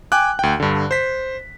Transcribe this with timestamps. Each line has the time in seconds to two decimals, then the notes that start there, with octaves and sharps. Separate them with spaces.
0.12 G5 G#5 D6 F#6
0.39 D2 G5
0.60 G2 D3
0.91 C5 B6